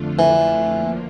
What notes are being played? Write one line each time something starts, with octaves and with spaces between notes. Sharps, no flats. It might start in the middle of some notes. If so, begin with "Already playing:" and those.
Already playing: F2 D3 A3 D4 F4
E3
D3 F3 A#3